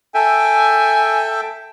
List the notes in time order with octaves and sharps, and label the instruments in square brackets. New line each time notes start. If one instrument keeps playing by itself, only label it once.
[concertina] A4 E5 G5 [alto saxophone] G#5